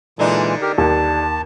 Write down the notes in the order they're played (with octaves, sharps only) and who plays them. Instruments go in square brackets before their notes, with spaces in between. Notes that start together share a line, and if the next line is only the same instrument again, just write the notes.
[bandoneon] A#2 E3 G#3 [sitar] D3 D4 D#4
[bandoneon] G4 A#4
[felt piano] D#2 [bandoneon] A5